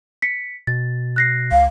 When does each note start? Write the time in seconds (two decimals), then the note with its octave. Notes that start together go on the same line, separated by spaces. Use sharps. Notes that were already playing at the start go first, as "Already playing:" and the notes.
0.22 B6 C#7
0.67 B2 A6
1.16 F#6 A#6 C7
1.51 C#2 F5